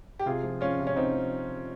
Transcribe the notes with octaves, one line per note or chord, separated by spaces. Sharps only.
G4
C3 F4 G#4
F3
F3 C#4 F4
C3
C#4
C3 C4 D#4
F3